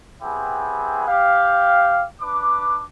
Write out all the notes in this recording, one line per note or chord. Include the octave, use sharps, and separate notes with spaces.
B3 C4 E4 G4 G#4
G4 F5
D4 B4 D6